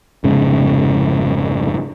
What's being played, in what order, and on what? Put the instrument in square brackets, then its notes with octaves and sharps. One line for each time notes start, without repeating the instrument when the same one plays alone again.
[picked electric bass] F1 G#2 C#3